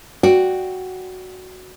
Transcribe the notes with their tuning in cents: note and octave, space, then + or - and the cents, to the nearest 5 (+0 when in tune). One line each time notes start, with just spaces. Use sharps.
F#4 +0 D5 +0 G5 +0